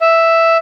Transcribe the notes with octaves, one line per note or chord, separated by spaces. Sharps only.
E5